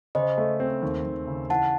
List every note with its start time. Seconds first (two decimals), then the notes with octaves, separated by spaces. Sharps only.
0.15 C#3 C5 D#5
0.38 A3
0.60 C4
0.82 D#2
1.06 D#2
1.27 C#3
1.50 E3 F#5 A5